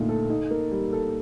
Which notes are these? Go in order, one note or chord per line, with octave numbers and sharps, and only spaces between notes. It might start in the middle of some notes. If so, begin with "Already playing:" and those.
Already playing: A#2 D3 A3 D#4
A4
D#4
A#3
G3
A4